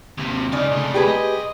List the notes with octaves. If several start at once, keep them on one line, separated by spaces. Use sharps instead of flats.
D#2 C3
C#3 C#4 D#4 D5
C3 A3
G4 G#4 B4
C2 D#5